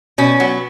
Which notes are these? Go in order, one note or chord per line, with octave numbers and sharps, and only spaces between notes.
B2 C#4
F#3 B3